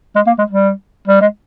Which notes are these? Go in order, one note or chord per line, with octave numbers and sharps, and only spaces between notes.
G#3
A#3
G#3
G3
G3
G#3